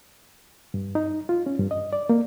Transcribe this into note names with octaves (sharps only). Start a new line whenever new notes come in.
G2
D#4
F4
C#4
G2
D#5
D5
A#3